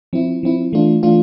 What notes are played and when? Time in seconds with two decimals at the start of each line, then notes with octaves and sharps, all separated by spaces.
0.13 F3 C4 E4
0.43 F3 C4 E4
0.73 E3 A3 D4 F4
1.03 E3 A3 D4 F4